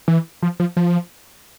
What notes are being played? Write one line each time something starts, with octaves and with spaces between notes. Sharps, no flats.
E3
F3
F3
F3